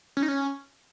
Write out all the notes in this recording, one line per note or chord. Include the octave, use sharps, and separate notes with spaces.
C#4
D#4
C#4